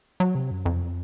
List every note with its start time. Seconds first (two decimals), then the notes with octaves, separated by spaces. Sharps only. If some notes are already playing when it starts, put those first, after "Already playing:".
0.20 F#3
0.35 C3
0.51 F#2
0.65 F2